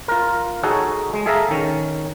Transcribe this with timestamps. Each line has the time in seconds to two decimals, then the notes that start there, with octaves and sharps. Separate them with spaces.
0.08 F4 A#4
0.63 D#4 F#4 G#4 A4 C#5
1.13 G#3
1.26 G#4 A4 E5 F5 A5 A#5
1.51 D#3 C#4